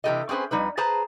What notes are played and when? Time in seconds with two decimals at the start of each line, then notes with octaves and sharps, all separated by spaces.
0.04 C3 E3 C4 G4 A4 D#5
0.29 C4 C#4 G#4 B4 C5
0.51 F2 G3 D#4 B4
0.77 G#4 B4 C5 A5 A#5